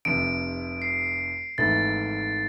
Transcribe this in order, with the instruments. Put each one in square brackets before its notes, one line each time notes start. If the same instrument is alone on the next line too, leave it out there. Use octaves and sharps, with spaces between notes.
[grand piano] F1 F2 C3 [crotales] D7
[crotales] C7
[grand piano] G#1 G#2 E3 A3 E4 [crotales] A6